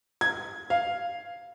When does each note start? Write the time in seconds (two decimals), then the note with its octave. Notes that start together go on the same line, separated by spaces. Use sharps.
0.21 G#6
0.70 F5